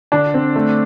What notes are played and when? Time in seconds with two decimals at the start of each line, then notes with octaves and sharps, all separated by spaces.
0.12 D3 D4
0.34 C4
0.56 A3